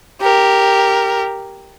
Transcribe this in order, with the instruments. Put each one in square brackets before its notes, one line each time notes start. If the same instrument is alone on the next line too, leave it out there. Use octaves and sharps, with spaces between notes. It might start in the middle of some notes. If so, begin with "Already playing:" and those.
[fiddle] G4 A#4